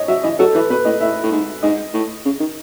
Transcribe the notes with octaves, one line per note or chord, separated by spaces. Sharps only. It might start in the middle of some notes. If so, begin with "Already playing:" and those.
Already playing: C#5 D#5
F#3 E5
E3 D#5
F#3 A4
E3 B4
B2 B4
A2 D#5
A2 E5
A2
G#2
G#2 D#5
A2
C#3
D#3